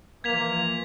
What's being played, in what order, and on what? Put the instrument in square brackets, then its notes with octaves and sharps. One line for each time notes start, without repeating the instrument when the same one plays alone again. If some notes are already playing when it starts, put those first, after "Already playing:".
[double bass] E3 F3 [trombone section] A#3 [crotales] G#6 B6 F7